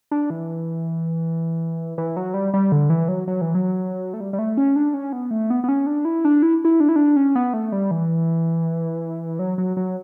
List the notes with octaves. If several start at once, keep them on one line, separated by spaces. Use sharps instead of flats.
D4
E3
E3
F#3
G3
G3
D3
E3
F#3
F#3
E3
F#3
A3
G3
G3
A3
C#4
D4
C#4
B3
A3
B3
B3
C#4
D4
E4
D4
E4
E4
D4
E4
D4
C#4
B3
A3
G3
E3
F#3
F#3
F#3